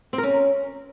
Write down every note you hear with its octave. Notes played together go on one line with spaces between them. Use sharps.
C4
A#4
C#4